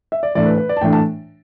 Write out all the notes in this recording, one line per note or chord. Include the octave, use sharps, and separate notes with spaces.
E5
D5
A2 E3 A3 D4 D5
B4
B4
D5
A5
A2 E3 A3 D4 G5
A5